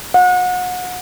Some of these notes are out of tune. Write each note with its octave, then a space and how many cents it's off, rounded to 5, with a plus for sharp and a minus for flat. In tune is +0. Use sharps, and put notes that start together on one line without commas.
F#5 -30